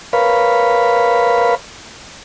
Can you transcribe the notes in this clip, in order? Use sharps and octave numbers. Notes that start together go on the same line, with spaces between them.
A#4 B4 C#5 F5 B5